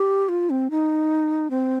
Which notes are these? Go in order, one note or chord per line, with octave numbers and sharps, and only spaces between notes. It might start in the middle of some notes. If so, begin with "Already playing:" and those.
Already playing: G4
F4
C4
D#4
C4